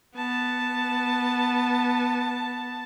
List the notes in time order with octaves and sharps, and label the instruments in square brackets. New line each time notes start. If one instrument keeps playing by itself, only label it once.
[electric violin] B3 [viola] A5